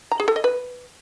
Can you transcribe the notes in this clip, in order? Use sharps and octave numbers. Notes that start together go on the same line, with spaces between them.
A#5
G#4
A4
D#5
B4